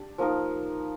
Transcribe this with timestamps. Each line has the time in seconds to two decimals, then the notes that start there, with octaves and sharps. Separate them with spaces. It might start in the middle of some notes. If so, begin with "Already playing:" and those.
Already playing: D4 G4
0.18 F3 A#3 D#4 A#4